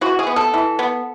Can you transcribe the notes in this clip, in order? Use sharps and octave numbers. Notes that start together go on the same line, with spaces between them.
E3 F#4
G#4
B3
A4
E3
B3